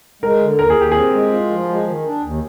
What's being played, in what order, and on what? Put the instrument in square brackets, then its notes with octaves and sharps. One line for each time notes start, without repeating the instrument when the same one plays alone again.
[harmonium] G#3 [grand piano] A#4
[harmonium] D3
[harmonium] D#2 [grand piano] A#4
[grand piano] G#4
[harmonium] D#2 [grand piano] G4
[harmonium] C4 [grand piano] G#4
[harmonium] G#3
F4
F3
G#3
D#3
D4
D#2